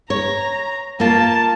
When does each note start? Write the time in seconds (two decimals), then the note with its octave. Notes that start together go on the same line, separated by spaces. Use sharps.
0.10 C#5 A#5
1.00 A#3 F4 A5